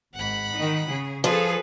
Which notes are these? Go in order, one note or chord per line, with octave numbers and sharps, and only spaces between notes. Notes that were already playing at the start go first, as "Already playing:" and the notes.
G#1 G#2 F#5 B5
D#3 D#4
C#3 G#4
F3 G#4 A4 B4 F5